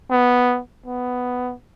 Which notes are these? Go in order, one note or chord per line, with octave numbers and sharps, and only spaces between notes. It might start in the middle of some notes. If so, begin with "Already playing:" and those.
B3
B3